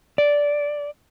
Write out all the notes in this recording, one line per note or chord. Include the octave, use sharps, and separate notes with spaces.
D5